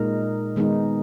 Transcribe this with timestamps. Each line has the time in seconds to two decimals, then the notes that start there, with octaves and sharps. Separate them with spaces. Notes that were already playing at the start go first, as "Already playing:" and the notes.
Already playing: A#2 G#3 D#4 A#4
0.56 D#3 G#3 B3 D#4